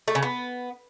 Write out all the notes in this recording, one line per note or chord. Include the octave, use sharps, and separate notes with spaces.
A3
C#3
B3